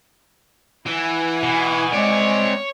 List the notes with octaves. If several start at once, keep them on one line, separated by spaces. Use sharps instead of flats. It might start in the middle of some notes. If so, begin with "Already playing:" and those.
E3 E4 F#5 G#5
B2
G#3 C4 C#5 D5